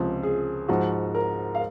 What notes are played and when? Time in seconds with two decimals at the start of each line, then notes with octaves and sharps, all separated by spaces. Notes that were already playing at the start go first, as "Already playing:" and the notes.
Already playing: C#2 C3 F3
0.23 G#4
0.68 G#2 F3 F#4
1.15 A#4
1.55 F5